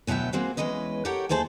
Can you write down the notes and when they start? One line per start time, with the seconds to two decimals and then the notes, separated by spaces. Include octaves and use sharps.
0.07 D2 B2 F#3 D4 E5 G5
0.33 G#3 A#3 C4 F#4 G#4
0.57 E2 G#3 C#4 B4 D#5
1.05 G4 A4 A#4 C#5 F#5 G5
1.29 D#2 A3 G#4 C5 A5